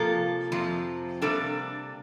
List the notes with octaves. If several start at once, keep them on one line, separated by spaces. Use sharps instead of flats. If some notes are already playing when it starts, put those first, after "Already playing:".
Already playing: C3 F3 A#3 F4 A4
F2 C3 F3
C3 G3 A#3 D4 A4